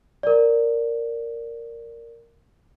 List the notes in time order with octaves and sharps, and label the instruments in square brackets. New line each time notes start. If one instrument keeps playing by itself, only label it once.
[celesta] A#4 D5